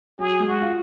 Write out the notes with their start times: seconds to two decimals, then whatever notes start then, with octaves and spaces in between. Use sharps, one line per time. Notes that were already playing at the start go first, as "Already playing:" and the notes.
0.19 F#3 G#4
0.40 G#3
0.47 F#4
0.61 F4